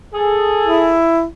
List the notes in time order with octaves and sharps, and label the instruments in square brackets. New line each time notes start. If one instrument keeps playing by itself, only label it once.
[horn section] G#4 A4
[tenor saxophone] E4